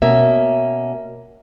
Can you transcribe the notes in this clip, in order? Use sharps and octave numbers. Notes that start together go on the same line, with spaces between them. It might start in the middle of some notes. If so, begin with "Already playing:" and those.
B2 A#3 C#4 E5